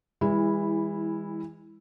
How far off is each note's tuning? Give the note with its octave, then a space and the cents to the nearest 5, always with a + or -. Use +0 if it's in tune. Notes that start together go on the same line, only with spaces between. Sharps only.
E3 -15 G#3 -40 E4 +0